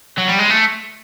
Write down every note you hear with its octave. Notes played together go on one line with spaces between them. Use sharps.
F#3
G3
G#3
A3